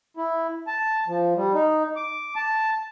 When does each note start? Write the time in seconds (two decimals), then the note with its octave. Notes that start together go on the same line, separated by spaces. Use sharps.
0.17 E4
0.67 A5
1.08 F3
1.37 G3
1.54 D#4
1.96 D6
2.36 A5